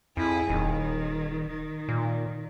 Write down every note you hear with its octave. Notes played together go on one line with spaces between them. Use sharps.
F2 E4 G#4
D#1 D#3
D#3
A#2